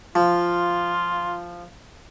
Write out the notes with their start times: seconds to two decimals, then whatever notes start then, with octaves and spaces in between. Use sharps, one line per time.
0.15 F3 F4